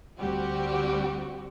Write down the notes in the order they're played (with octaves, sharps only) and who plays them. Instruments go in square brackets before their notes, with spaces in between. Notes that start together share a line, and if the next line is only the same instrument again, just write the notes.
[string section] D2 G3 C4 F#4 G4